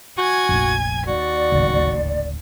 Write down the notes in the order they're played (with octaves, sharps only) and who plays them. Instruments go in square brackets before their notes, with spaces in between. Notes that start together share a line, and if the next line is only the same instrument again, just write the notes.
[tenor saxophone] F#4 [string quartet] G#5 G#6
[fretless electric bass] F1 A#1
[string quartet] D#2 [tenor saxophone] F#4 [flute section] D5
[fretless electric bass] D1 G#1 C#3